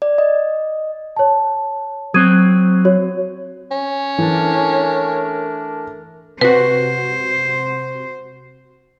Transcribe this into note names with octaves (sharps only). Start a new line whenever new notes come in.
D5
D#5
C#5 A5
F#3 C4 D#6 G#6 D#7
F#4 C#5
C#4
E3 A3 D4 A#4
C3 F#4 B4 C5